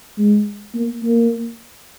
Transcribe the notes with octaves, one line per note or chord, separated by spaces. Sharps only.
G#3
A#3
A#3